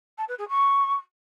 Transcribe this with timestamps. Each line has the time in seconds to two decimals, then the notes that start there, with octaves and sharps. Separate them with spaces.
0.18 A5
0.28 B4
0.38 G#4
0.49 C#6